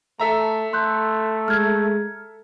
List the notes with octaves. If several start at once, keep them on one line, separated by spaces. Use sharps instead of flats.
A3 A4 E5 A#5
A3 C6 F#6 G6
G#3 F6 G#6